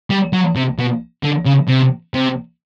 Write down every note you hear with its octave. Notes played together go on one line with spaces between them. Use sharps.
G3
F#3
C3
B2
D3
C#3
C3
C3